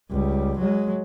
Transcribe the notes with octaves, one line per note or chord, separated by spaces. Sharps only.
C#2 G3
F#3 G#3